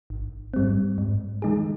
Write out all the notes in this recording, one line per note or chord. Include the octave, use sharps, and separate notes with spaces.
G#1
G#2 G3 C4
G#2
D#3 G#3 D#4 G#4